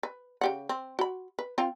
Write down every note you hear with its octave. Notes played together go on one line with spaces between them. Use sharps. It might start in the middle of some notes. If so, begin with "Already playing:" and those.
B4
C#3 G4 F#5
C4
F#4 B5
B4
C4 F4 G5